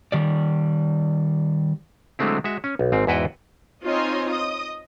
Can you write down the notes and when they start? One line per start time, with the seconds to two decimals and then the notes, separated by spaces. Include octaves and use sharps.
0.12 D#3 G3 D5
2.19 D3 F#3 G#3 A3 C4 E4
2.44 G#3 F#4 E5
2.64 C#4
2.79 B1
2.92 G#1 G#2 C4
3.07 E2 G#2 E4 F#4 B4 G5
3.84 C4 D#4 F4 C#5 D#5 G#5
4.29 D#5 D#6